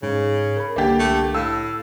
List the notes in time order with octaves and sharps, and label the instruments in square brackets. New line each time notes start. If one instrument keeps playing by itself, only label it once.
[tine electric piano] G#2 [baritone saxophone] C#3
[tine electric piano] A#4 B5
[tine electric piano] C2 D3 A6 [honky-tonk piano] A#3 G4
[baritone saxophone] A3
[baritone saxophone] A2 [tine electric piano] F5 A6 [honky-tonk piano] E6